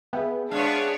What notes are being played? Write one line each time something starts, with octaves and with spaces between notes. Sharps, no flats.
B3 G#4 E5 G5
G#3 B3 D4 C#5 F5